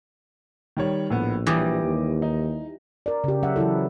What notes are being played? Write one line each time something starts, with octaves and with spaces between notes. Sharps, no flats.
D#3 G3 C#5
A#1 A2 B3
E3 G3 D6 D#6 A#6
D#2
D#4
A#4 D5
C#3 G4
F#3 C#4 E5 F#5
E3 F#3 E4 A4